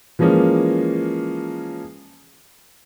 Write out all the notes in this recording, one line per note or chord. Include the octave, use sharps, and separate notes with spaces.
E3 F3 G#3 A#3 C#4